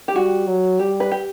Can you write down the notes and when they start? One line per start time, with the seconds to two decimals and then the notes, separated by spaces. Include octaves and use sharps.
0.08 G4
0.15 G3 F#4
0.48 F#3
0.79 G3 G4
1.00 B4
1.12 G4